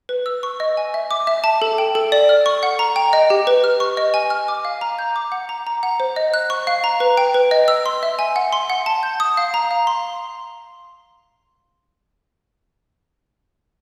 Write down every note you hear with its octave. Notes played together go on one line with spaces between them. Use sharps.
B4
E6
C#6
D#5
G#5
E5
D6
E5
A5
A4
G5
A4
D5
F6
C#6
F#5
A#5
G5
D#5
G4
B4
F6
C#6
D#5
G#5
F6
D6
F5
A#5
G6
D6
F#5
A#5
A#5
F#5
C5
D#5
F#6
C#6
F5
A#5
B4
G5
B4
D#5
E6
C6
E5
G#5
F#5
C6
F#5
A5
G6
D#6
F5
A#5
F5
C6